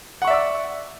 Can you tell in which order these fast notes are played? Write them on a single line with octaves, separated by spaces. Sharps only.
F#5 C#6 E5 D5 E6